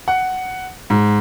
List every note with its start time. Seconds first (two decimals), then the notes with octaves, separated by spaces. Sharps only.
0.08 F#5
0.90 G#2